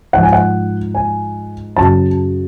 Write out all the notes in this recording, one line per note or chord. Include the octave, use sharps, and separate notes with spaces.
G#2 F3 F#5
G#5
F#5
G#5
F#2 C#3 F#3 A5